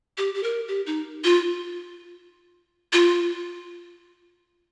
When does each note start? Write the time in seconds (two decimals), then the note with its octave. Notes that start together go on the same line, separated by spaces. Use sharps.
0.18 G4
0.34 G4
0.43 A#4
0.68 G4
0.86 D#4
1.24 F4
2.93 F4